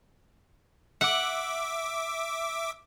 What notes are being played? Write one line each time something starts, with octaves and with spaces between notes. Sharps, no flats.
E5 F#5 D6